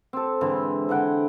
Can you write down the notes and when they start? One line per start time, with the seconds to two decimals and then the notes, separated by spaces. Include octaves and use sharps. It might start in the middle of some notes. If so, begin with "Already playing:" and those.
0.13 C4 A4
0.41 G#2 D3 E3 C4
0.89 D3 E3 F#5 G5